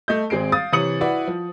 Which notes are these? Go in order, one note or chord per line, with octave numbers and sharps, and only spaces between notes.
A3 D#5 G6
G#1 G#3 C4 G#4 C7 D7
F5 D#6 A6
C3 E3 C#5 D#6 C#7 F#7
E4 F#4 B4 D5 F#5
F3